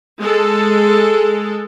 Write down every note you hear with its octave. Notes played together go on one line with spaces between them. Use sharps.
G#3 A4